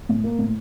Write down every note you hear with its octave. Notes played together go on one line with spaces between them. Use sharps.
A2
A#3
A2